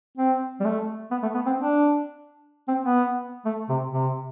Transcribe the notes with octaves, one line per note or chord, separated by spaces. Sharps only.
C4
G3
A3
B3
A3
B3
C4
D4
C4
B3
A3
C3
C3